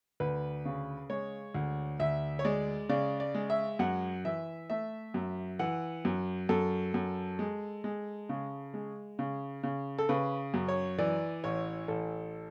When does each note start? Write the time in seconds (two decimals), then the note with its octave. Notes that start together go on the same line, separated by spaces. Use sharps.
0.20 D2 B4
0.65 C#3
1.10 G#3 C#5
1.55 D2
2.00 D2 E5
2.39 C#5
2.45 G#3 D5
2.89 C#3 D5
3.20 D5
3.34 G#3
3.50 E5
3.79 F#2 F#5
4.25 E3 E5
4.70 A3 E5
5.14 F#2
5.59 E3 F#5
6.05 F#2
6.49 F#2 A4
6.94 F#2
7.39 G#3
7.84 G#3
8.29 C#3
8.74 G#3
9.19 C#3
9.63 C#3
9.99 A4
10.09 C#3 B4
10.54 F#2
10.68 C#5
10.98 E3 D5
11.44 A1 C#5
11.88 A1 A4